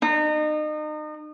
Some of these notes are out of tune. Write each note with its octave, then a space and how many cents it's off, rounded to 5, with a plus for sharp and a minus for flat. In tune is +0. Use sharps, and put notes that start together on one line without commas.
D#4 -35